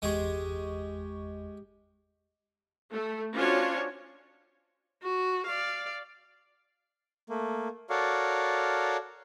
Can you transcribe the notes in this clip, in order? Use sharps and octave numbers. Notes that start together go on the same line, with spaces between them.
G1 E2 G#3 G4 G#4 C#6
A3
C#4 D4 F4 F#4 C5 C#5
F#4
D5 F5
A3 A#3
F#4 A4 A#4 C#5 D5 F5